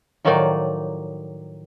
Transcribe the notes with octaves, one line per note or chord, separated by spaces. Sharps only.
A2 D#3 F3 F#3 D#4 D5